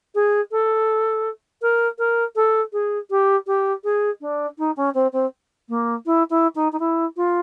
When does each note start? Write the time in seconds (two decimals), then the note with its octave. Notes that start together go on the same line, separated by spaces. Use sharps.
0.15 G#4
0.51 A4
1.62 A#4
1.98 A#4
2.35 A4
2.73 G#4
3.10 G4
3.47 G4
3.84 G#4
4.21 D4
4.58 D#4
4.77 C#4
4.94 C4
5.12 C4
5.69 A#3
6.06 E4
6.30 E4
6.55 D#4
6.72 D#4
6.79 E4
7.17 F4